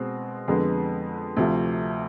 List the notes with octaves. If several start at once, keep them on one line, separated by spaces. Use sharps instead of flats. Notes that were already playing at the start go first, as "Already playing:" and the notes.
Already playing: B2 G#3 C4
F2 D3 G#3 B3
D2 C3 F3